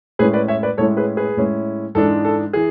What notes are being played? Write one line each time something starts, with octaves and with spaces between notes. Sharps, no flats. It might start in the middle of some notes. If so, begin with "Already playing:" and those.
A2 G#3 C#4 E4 G#4 B4
B4 D5
C#5 E5
B4 D5
A2 G#3 C#4 E4 A4 C#5
G#4 B4
G#4 B4
A2 G#3 C#4 E4
G#2 E3 G#3 D4 A4
A4
E3 G#4